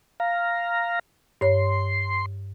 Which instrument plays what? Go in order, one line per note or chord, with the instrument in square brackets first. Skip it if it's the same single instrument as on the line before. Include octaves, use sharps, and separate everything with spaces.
[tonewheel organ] F5 A#5
[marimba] G2 C#5 [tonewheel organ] C6